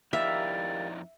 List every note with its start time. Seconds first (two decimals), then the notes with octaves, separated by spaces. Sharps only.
0.13 F2 D#4 E4 G4 A#4 D5 E5 F5